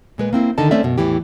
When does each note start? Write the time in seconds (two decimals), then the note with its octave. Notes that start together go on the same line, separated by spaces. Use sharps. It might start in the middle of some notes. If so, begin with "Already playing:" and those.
0.18 A#2 G#3 B4
0.33 A#3 C4 E4
0.58 D2 D3 D#3 A4 D#5 A5
0.71 A3 C4 C#4 D5 E5
0.83 F#2 B2
0.98 E2 A2 E3 G4